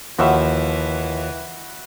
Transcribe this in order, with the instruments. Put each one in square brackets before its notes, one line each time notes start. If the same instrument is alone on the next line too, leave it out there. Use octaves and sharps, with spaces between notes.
[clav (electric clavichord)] D#2 F3 [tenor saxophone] E3 [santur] F#4 E5 B5